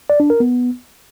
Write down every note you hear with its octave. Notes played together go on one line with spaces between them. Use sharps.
D5
D4
A#4
B3